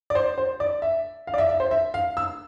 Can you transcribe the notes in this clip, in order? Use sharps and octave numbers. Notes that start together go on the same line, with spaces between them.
D5
C5
C5
D5
E5
F5
D5
E5
E5
C5
E5
F5
E6